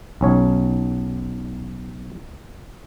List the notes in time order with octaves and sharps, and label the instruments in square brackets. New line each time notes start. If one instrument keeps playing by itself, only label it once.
[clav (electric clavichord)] B1 C#4 C#5